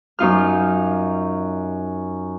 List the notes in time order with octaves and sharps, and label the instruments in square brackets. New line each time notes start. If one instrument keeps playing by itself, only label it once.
[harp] F#2 D#4 F4 F6